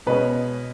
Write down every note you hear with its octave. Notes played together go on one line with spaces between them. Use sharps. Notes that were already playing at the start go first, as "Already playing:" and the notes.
B2 G#3 C#4 B4